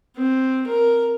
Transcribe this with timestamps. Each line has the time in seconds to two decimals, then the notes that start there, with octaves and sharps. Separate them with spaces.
0.17 C4
0.67 A#4